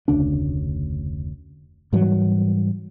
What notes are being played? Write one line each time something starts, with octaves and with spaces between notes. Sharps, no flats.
F1 D2 C#3 D4
G#2 E3 F#3 G3